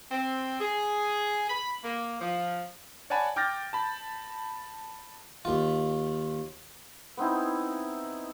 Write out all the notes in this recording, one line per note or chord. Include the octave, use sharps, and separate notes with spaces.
C4
G#4
B5
A#3
F3
C#5 D5 F#5 G#5 A5 B5
G5 D6 F6 G6 A6 A#6
A5 B5
D#2 F4
B3 C4 D#4 E4